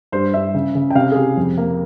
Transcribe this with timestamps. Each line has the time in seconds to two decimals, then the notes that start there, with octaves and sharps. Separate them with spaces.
0.12 G2 C5
0.34 G2 E5
0.54 C#3
0.75 C#3
0.91 G5
0.95 C3 F5
1.12 G#4
1.16 C3 G4
1.37 F2
1.58 A#3